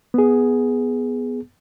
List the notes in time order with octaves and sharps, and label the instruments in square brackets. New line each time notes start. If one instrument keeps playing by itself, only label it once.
[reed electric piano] B3 G#4